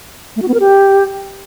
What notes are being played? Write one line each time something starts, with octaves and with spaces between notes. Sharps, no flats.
A3
F#4
B3
A#4
G4